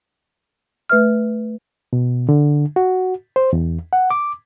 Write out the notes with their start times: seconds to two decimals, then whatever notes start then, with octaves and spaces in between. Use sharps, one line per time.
0.90 A3 B4 E5 F6
1.93 B2
2.29 D3
2.76 F#4
3.36 C5
3.53 E2
3.93 F#5
4.11 D6